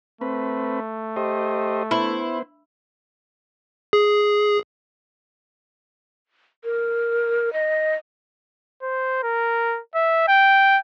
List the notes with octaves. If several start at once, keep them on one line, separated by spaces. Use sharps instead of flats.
A3 C4 B4
G4 C5 D#5
B3 E4 C5
G#4
A#4
D#5
C5
A#4
E5
G5